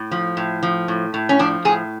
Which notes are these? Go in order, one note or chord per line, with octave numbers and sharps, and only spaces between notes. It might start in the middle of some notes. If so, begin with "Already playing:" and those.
Already playing: A2
F3
A2
F3
A2
A2
C#4
F3 D4
A2 G#4